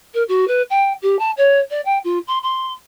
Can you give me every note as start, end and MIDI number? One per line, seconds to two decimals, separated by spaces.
0.14 0.23 70
0.28 0.47 66
0.48 0.62 71
0.70 0.93 79
1.02 1.18 67
1.19 1.31 81
1.37 1.60 73
1.70 1.81 74
1.85 1.98 79
2.04 2.19 65
2.27 2.38 84
2.43 2.73 84